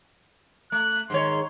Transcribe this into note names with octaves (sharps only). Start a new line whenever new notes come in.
A3 F#6
G#2 D#3 C#5 C6